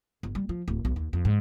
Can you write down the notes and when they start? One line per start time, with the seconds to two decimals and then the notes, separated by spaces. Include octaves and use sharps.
0.23 G1
0.35 G3
0.49 F3
0.68 D1
0.85 B1
0.96 D#2
1.13 F2
1.25 G#2